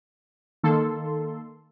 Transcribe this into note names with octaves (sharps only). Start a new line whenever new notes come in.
D#3 A#3 A4 C6